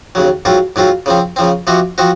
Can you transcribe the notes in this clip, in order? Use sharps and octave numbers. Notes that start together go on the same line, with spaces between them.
D#2 C#3 F#3
G#2 F#3 C4 F4
G#2 F#3 C4 F4
C#3 F3 C4
C#3 F3 C4
C3 F3 C4 F#4
F3 C4 F#4